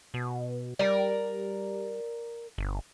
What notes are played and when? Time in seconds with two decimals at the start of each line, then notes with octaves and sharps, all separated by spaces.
0.14 B2
0.79 G3 A#4 D5
2.58 G1